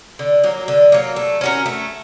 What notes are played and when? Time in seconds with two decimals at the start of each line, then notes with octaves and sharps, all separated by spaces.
0.19 D3
0.44 F#3 A#3
0.68 D3
0.92 F#3 A#3
1.16 A3
1.41 C#4 F#4 A#4
1.66 A3